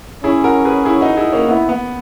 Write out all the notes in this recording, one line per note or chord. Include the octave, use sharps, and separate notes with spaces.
C#4 E4 G#4
F#4 A#4
G#4 B4
E4 G#4
D#4 F#4
E4 G#4
A#3 C#4
B3 E4
B3